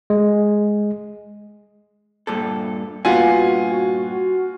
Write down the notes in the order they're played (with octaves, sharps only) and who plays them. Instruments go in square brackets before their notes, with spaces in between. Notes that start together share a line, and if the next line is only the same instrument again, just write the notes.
[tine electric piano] G#3
[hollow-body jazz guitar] G2 A#2 A4
[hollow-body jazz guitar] G2 A#2 B3 [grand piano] F4 F#5 G#5 [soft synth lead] F#4
[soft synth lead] F#4